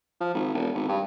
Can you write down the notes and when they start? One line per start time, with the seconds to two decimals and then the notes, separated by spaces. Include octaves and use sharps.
0.21 F3
0.35 G#1
0.54 E1
0.75 G#1
0.89 G2